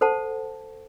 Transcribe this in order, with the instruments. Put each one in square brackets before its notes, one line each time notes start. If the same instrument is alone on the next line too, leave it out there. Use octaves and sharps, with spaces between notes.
[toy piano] A4 C5 F#5 A5